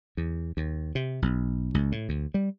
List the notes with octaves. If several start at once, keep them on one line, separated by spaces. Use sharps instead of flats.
E2
D#2
C3
B1
C#2
A2
D2
G3